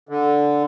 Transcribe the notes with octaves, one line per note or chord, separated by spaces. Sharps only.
D3